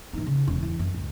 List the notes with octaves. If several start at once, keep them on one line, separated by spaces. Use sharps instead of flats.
E3 D#4
C#3
E1 C#4
E3
F#2
C#2